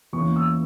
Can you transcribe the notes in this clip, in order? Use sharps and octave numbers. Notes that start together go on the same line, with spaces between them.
E2 E3 A#3 C#4 C#6
E6